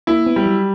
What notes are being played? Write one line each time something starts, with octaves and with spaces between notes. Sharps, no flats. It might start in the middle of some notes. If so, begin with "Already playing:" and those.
A#3 E4
B3
G3
F#3